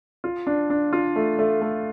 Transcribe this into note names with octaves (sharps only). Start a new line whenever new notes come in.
F4
D4
D4
F4
A3
A3
A3